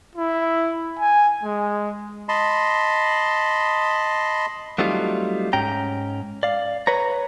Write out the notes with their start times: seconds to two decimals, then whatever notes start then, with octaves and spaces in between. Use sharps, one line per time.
0.15 E4
0.99 G#5
1.43 G#3
2.29 D#5 A5 B5 C6
4.78 F#3 G3 A3 C4 D#4 F4
5.53 G#2 C#4 G5 A#5
6.43 D5 F5
6.87 B4 C#5 A#5